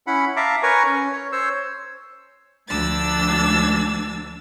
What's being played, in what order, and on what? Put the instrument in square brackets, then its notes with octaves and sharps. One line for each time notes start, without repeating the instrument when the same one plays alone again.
[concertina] C#4 E4 F#5 B5
E5 F5 A5 A#5 D6
A#4 B4 C#5 G#5 A#5 C#6
C#4
C#5
C5 C#5 E6
[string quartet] D2 F3 A3 D4 E6 A6